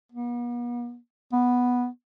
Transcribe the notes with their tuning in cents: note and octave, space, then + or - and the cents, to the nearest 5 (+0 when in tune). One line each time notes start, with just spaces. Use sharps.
B3 -45
B3 -5